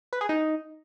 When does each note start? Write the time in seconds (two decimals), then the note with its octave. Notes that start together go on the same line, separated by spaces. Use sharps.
0.13 B4
0.21 G#4
0.29 D#4